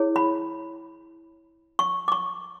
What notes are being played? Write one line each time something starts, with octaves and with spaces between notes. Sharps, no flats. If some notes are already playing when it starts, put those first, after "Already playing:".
Already playing: E4 G#4 C#5
B5
C#6
D6
C#6